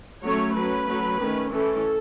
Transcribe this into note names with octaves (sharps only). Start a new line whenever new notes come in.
F#3 A3 C#4 C#5
F#3 C#4 B4
F#3 A3 C#4
D#3 A3 C#4
E3 A3 C#4 A4